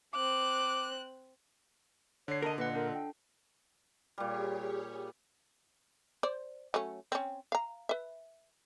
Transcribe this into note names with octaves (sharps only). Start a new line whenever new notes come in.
C4 D6 F#6
D3 C#5 C7
A#4 D#5 A5
A#2 F4 B4 D#5 F#5
D4 A4 A#4
G5
A#2 G3 G4 G#4 C#5
C5 D5
F#3 A3 C#4
C4 C#4
F5 A#5
B4 E5